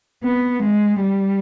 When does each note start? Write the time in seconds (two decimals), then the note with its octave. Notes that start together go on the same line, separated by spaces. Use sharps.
0.23 B3
0.63 G#3
1.02 G3